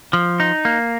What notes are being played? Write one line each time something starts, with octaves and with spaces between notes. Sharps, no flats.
F3
D#4
A#3